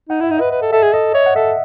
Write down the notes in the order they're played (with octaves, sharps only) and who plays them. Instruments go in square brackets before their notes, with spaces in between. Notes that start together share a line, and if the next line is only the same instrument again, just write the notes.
[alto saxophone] D#4 [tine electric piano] F#5
[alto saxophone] E4 [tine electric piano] E5
[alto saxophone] D#4
[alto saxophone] B4 [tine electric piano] D#5
[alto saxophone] B4
A4
[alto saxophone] A4 [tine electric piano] E5
[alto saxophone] G#4
[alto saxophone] A4 [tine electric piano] D#5
[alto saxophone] C#5 [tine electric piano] E5
[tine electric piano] F#5
[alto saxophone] A4 [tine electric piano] E5